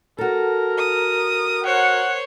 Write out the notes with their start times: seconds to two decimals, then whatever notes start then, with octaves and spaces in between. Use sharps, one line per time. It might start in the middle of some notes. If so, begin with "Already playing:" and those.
0.18 F#4 A4 A#4
0.78 D#6
1.64 C5 C#5 F#5